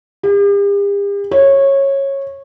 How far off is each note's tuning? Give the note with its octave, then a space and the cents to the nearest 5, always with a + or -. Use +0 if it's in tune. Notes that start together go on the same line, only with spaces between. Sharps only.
G4 +45
C#5 -15